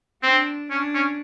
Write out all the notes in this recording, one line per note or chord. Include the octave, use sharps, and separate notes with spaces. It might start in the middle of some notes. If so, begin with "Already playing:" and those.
C4 D4
C#4 D4
C#4